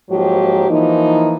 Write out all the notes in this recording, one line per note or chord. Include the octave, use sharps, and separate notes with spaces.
G#2 F3 F#3 A#3 G4
E3 F3 A#3 D#4